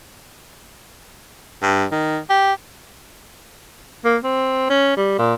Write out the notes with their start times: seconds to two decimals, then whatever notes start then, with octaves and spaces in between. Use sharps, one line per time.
1.62 G2
1.92 D#3
2.30 G4
4.05 A#3
4.24 C4
4.70 C#4
4.97 G3
5.19 A#2